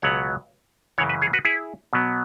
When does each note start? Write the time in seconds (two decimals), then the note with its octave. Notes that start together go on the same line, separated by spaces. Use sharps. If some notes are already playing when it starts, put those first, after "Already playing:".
0.02 C#2 B2 F#3 B3 C#5 F#5
0.98 F#2 C#3 E3 C#5 F#5
1.09 B4 E5
1.21 G#4 C#5
1.33 F#4 B4
1.45 E4 G#4
1.93 B2 F#3 B3